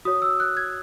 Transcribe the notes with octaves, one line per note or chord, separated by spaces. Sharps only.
F#4 C#5 D#6
E6
F#6
G#6